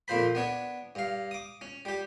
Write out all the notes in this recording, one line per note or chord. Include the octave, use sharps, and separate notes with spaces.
F2 A#2 F3 C5 B5
B3 D4 C#5
G2 F5
D6 D#6
C#4
G3 G4